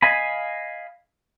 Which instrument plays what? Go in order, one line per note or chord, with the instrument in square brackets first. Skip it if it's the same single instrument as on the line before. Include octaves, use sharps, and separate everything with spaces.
[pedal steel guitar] D#5 F5 G#5 B5